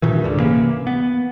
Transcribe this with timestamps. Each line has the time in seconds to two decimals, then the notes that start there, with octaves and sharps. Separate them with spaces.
0.02 G2 A#2 D#3 E3
0.24 C#2 G#2 D3
0.40 C3 E3 A#3 C#4
0.87 B3